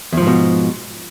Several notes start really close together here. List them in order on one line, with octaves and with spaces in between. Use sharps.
E2 F3 G#2 B2